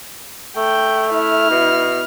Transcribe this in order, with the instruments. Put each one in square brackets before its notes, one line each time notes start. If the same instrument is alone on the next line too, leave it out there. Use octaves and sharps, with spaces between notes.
[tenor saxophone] A3 [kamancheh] G5
[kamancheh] E4 F6
[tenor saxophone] B2